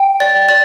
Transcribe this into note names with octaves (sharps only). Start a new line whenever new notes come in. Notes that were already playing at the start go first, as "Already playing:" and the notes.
Already playing: G5
D5
D5